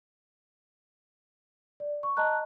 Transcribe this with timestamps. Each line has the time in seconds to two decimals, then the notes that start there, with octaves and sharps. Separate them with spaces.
1.80 D5
2.03 C#6
2.17 D#5 A5 A#5 F#6